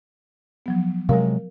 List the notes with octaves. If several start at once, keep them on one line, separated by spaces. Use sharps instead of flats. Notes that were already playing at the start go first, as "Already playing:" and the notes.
F3 F#3 B3
C3 F#3 G#3 A#4 F5